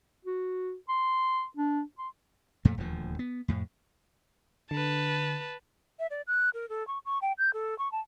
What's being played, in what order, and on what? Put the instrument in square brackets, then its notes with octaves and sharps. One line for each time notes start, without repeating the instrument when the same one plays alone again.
[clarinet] F#4
C6
D4
C6
[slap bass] F2 A#2 A3
D#1 D2 F3
B3
F2 A2
[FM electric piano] D3 [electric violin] B4 A5
[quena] E5
D5
F#6
A#4
A4
C#6
C#6
G5
G6
A4
C#6
A5